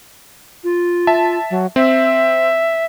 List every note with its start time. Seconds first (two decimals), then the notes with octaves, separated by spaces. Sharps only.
0.64 F4
1.07 E5 A5
1.51 F#3
1.76 C4 E5